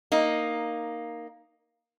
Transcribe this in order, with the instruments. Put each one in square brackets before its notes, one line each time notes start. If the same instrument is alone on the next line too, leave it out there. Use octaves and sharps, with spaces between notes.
[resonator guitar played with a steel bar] A#3 D#4